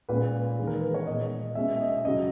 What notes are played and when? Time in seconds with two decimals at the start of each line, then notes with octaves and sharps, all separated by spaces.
0.09 A#2 G#3 C#4 B4
0.58 E2 D#3 G#3
0.67 A#4
0.81 B4
0.94 C#5
1.07 A#2 G#3 B3 D#5
1.55 B2 G#3 C#4 E5
1.76 E5
1.81 D#5
2.04 F#2 C#3 F#3 D#5